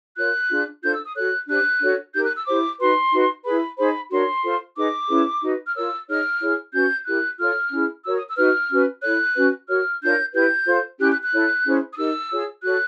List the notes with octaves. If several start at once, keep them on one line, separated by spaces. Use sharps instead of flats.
F4 A#4 C#5 F#6
D4 F4 G#4
D4 F4 A4 C5 G6
E6
D#6
F#4 A4 C#5 F#6
D4 G4 C5 F#6
D4 F#4 A4 C#5
D#4 G4 A#4 G6
F#6
E6
E4 G4 C5 D6
D#4 F#4 B4 C6
D#4 F#4 B4
E4 G#4 B4 B5
D#4 G#4 C5 B5
D4 F#4 A#4 C#5 C6
F4 A4 C5
D#4 G#4 B4 D6
C#4 E4 G#4 B4
D#4 F#4 B4
F6
F4 A#4 C#5 E6
D#4 G#4 C#5 F6
E4 G#4 C#5
C#4 F#4 B4 G6
E4 G4 A#4 F#6
F4 A4 C#5 F6
C#4 E4 G#4
F#4 A#4 C#5 E6
D#6
E6
D#4 F#4 B4 F6
C#4 F#4 B4
E4 A4 C#5 F#6
C#4 F#4 B4
F#4 A#4 C#5 F6
D4 F4 A#4 C#5 G6
E4 G4 B4 G6
F4 A4 C5
C#4 E4 G4 F#6
F#6
F#6
E4 A4 C#5
C#4 E4 G#4 C5
D#6
D#4 G4 A#4 E6
F4 G#4 C#5
F#4 A4 C#5 F#6